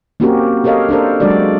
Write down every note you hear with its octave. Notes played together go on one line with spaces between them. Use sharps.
A#3 C4 C#4 F#4 G4 A#4
G4 A4 A#4 C#5 D#5 F5
D4 A4 A#4 C5
F#3 G#3 D4 F#4 A4 D5